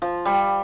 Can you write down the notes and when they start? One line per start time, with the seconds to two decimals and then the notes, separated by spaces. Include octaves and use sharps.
0.02 F3
0.25 G3